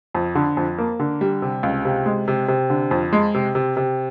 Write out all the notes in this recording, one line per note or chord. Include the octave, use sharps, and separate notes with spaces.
F2
D3
F2
A#3
D3
G3
C3
C#2
C3
G#3
C3
C3
D3
F2
G#3
C3
C3
C3